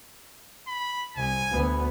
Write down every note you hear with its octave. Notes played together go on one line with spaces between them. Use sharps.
B5
C2 G#5
D2 B3